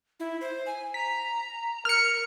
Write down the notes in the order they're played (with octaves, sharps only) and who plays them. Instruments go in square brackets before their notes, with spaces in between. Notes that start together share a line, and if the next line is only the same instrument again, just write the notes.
[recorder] E4
C5
G#5
[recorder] A#5 [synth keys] B6
[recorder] A#4 [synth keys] F6 C#7